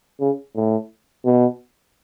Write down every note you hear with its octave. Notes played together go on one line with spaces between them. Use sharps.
C#3
A2
B2